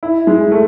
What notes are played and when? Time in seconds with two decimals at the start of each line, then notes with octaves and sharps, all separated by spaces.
0.03 E4
0.27 G#3
0.51 A3